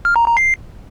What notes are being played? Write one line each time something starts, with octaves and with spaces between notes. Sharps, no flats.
F6
A#5
A#5
C7